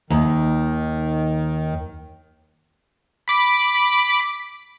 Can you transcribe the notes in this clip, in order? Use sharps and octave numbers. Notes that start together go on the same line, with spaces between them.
D#2 D#3
B5 D6 B6